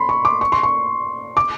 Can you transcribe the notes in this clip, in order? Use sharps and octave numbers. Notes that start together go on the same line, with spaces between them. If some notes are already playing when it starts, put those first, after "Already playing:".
Already playing: B5 C6
C#6
D6
C#6
C6
C#6
D6